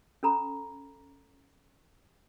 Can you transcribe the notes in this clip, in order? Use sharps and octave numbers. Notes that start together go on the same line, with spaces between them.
C#4 A4 A#5 B5